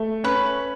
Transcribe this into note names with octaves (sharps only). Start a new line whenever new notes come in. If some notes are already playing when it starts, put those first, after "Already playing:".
Already playing: A3
C#4 B4